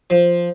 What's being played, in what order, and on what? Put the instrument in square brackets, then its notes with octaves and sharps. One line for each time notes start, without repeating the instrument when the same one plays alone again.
[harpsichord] F3